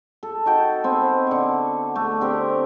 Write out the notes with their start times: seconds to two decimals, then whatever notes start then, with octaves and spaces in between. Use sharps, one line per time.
0.23 A4
0.46 D#4 F#4 G5 A5
0.84 B3 C4 G#5
1.27 D3 C#6
1.96 A3
2.21 D3 C4 G4 A#4